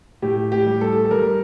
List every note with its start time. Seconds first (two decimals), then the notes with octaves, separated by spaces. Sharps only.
0.22 A2 G4
0.52 G4
0.66 G3
0.81 A4
1.05 A4
1.11 G3 A#4